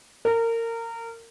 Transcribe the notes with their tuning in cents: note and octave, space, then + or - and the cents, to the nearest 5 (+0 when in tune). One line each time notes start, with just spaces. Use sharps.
A#4 -25